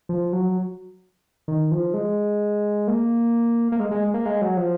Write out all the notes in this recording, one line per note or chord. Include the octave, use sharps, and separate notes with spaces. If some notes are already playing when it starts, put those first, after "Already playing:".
F3
F#3
D#3
F3
G#3
A#3
A#3
G#3
G#3
A#3
G#3
F#3
F3